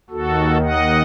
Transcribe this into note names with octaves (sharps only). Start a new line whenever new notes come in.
D#2 D#3 F#4 A4
D#5 F#5